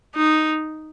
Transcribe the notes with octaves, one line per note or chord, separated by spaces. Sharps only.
D#4